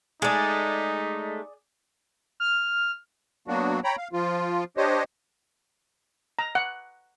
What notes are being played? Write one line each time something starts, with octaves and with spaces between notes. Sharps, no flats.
G#3 A3 D#4 G#4 D5
F6
F#3 A#3 B3 D4 F#4
C#5 G5 A#5 B5
F5
F3 F4
D4 G4 C5 C#5 D#5
A#5
F#5